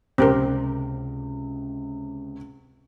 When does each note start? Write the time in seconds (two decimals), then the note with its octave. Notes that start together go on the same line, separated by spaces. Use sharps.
0.18 C#2 C3 C4 G4 A#4